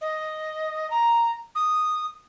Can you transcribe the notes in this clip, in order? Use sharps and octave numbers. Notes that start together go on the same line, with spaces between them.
D#5
A#5
D#6